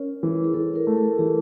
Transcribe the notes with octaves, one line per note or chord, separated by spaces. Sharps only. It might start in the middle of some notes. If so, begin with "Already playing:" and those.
Already playing: C#4 A#4
E3
G#4
E3 A4
A#4
A3
A4
E3 G4